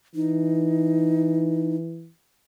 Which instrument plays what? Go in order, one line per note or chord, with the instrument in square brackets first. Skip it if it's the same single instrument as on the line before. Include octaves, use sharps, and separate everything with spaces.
[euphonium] E3 [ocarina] D#4